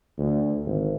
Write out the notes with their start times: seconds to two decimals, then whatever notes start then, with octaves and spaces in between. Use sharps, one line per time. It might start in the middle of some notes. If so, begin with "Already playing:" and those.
0.18 D2
0.66 G#1